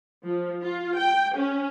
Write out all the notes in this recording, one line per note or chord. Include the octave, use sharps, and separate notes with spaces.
F3
F4
G5
C#4